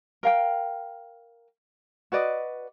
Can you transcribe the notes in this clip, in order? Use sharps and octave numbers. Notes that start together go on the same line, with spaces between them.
A#4 F5 G5
F#4 B4 D5 D#5